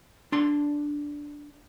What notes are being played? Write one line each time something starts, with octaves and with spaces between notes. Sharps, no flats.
D4 C6